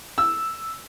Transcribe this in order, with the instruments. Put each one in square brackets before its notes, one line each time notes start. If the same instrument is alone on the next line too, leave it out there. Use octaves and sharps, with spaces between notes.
[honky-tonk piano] E6